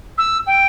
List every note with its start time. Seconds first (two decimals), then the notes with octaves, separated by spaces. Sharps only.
0.17 E6
0.46 G5